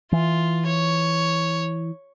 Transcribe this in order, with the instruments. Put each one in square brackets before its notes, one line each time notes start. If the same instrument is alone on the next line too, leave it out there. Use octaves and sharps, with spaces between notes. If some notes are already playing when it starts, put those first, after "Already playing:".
[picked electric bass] E3 [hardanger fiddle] F4
[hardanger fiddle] C#5